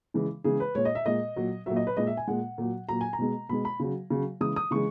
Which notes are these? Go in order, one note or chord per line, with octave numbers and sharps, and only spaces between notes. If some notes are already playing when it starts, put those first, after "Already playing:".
C#3 E3 G#3
C#3 E3 G#3 G#4
B4
A#2 G#3 C#5
D#5
E5
A#2 G#3 D#5
A#2 F#3
A#2 F#3 E5
D#5
B4
A#2 G#3 D#5
E5
G#5
A#2 G#3 F#5
A#2 F#3
A#2 F#3 A#5
G#5
A#5
B2 G#3
B2 G#3 B5
B5
C#3 F#3
C#3 F#3
C#3 E3 G#3 D#6
D#6
C#3 E3 G#3 C#6